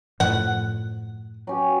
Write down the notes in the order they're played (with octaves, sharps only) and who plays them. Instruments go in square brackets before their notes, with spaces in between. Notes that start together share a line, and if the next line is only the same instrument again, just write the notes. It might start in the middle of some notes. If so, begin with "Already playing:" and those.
[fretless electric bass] F#2 A2 F3 [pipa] F#5
[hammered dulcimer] F#3 C#4 G4